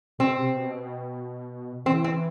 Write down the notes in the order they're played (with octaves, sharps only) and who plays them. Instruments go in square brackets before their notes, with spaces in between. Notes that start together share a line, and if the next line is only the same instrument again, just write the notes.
[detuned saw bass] B2 [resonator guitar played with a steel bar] C4
[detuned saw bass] C3
B2
[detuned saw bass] E3 [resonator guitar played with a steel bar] C4
[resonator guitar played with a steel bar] C4